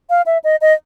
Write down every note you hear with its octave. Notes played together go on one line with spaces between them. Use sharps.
F5
E5
D#5
D#5